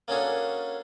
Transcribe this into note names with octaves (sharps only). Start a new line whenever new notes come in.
A#3 C#4 D4 F#4 G#4 A4